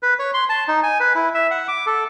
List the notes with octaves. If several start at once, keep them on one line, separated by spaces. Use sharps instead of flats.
B4
C#5
C6
A5
D#4
G#5
B4
E4
E5
F#5
D6
A4